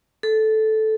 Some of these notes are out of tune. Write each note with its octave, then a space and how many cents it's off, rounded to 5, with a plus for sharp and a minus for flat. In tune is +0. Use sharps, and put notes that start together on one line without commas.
A4 -10